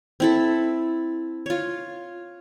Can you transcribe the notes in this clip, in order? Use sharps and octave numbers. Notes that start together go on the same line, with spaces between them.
C4 E4 A4
F4 C#5